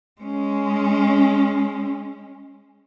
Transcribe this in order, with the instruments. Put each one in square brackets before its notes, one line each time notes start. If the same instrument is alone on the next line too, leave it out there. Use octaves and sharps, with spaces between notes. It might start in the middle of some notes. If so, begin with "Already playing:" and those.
[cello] G#3 C#4